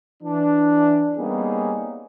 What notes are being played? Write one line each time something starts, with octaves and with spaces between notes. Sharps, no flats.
E3 D4
G3 A#3 B3 C#4 D#4 G#4